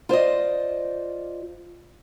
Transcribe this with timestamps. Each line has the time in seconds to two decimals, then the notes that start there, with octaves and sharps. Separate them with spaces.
0.09 F4 C5 D5 D#5